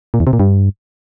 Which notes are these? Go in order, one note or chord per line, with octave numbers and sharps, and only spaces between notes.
A#2
E2
C3
A#2
G2